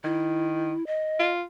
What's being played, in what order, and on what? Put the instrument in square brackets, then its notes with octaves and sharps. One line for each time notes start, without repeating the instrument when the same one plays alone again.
[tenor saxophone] D#3 [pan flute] E4
[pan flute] D#5
[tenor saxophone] F4